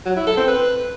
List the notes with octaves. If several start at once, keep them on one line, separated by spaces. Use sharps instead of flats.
F#3
E4
A4
C4
B4